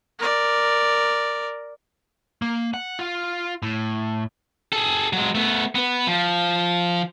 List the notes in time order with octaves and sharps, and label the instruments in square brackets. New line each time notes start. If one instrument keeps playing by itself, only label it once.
[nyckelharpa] A#4 D5
[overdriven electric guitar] A#3
F#5
F4
A2
[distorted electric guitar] G#4 A4
F#3 G#3
A3 B3
B3 B4
F3